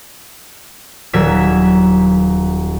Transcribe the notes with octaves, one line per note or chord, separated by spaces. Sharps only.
D#1 F#3 E6 G#6 B6